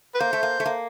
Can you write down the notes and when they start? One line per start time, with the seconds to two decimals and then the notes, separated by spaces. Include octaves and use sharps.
0.15 B4
0.20 A#3 C5
0.33 A3
0.43 A#3
0.60 A3
0.66 A#3